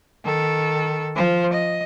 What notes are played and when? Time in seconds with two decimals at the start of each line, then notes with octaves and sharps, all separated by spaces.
0.25 D#3 A4
1.16 F3 C5
1.53 D#5